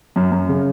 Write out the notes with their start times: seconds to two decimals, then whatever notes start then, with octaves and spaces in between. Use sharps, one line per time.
0.16 F#2
0.32 F#2
0.49 C#3